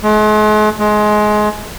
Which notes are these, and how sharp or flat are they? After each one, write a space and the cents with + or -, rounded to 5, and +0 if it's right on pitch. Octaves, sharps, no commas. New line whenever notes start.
G#3 +45
G#3 +25